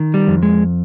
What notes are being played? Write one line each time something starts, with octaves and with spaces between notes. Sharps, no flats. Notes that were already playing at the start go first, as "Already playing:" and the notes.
Already playing: D#3
G3
F2
G#3